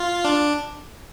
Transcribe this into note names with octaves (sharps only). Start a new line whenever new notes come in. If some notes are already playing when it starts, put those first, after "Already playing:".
Already playing: F4
D4